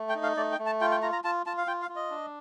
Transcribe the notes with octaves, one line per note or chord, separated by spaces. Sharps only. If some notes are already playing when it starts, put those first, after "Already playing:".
Already playing: A3
G5
D#4
F5
A3 D5
G5
A3
A5
F4 G5
G5
F4 A#5
A#5
F4 A5
F4 A5
F5
F4 G5
F5
F4
D#5
D4